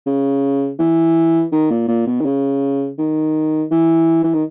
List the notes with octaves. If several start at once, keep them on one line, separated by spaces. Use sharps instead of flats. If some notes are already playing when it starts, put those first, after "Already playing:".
C#3
E3
D#3
A#2
A#2
B2
D#3
C#3
D#3
E3
E3
D#3